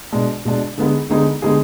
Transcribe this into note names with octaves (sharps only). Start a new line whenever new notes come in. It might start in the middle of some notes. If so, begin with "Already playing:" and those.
B2 G#3 D4
B2 G#3 D4
D3 G#3 B3 D#4 G#4
D3 G#3 B3 D#4 G#4
D3 G#3 B3 D#4 G#4